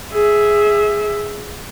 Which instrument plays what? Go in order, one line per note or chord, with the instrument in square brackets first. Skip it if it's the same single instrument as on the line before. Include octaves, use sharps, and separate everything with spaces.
[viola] G#4 E5